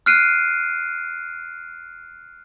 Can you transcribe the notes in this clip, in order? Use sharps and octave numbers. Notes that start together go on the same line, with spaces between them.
F6 F#6 C7 D7 D#7